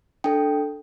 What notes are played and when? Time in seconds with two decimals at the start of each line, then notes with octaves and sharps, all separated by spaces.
0.24 D4 A4 G5